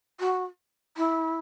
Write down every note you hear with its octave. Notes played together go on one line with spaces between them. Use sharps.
F#4
E4